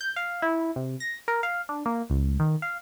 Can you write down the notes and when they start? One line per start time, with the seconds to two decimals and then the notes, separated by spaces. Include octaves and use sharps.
0.01 G6
0.16 F5
0.42 E4
0.76 C3
1.00 A#6
1.28 A#4
1.43 F5
1.69 D4
1.86 A#3
2.10 C#2
2.40 D#3
2.62 F5